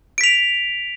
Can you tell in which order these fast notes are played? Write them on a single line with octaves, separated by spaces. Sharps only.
D7 B6 F7